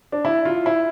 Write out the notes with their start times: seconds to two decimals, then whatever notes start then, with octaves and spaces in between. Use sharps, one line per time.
0.12 D4
0.25 E4
0.45 F4
0.66 E4